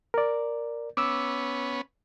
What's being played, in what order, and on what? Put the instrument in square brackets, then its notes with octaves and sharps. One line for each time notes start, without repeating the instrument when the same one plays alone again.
[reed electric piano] A#4 D5
[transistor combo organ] B3 C#4 [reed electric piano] D6 E6